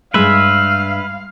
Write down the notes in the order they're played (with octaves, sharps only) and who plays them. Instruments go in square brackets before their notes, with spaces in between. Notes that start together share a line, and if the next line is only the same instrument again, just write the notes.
[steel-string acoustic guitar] E2 G2 [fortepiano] G#3 [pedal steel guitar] B4 E5 [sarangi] F5